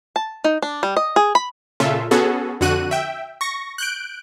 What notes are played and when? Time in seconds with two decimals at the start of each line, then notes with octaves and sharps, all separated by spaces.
0.16 A5
0.44 D#4
0.62 D4
0.83 G3
0.97 D#5
1.16 G#4
1.35 B5
1.80 A#2 C#3 F4 A4 E5
2.11 B3 C#4 F#4 G#4 A4
2.61 F2 D3 F#4 F#6 D#7
2.91 E5 G5
3.41 C#6 A#6
3.78 F#6 G6 D7